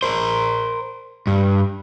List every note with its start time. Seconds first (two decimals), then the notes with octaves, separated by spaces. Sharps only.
0.03 A#4 C5
1.27 G2